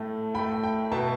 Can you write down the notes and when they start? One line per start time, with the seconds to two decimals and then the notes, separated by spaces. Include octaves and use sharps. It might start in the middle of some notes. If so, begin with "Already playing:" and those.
Already playing: A2 A3
0.34 A2 A3 G5 B5
0.63 G5
0.92 B2 B3 E5 A5